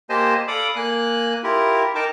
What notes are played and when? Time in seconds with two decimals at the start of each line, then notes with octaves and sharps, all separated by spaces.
0.10 A#3 G4 C5 D#5 G#5 A5
0.48 A4 D5 F5 B5 D6 D#6
0.76 A#3 G#5 F#6
1.44 E4 F4 G4 A#4
1.95 D#4 A#4 G5 A5 D6